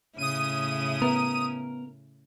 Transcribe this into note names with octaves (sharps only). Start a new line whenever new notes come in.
A2 C#3 E4 D#6 D#7
B3 A#4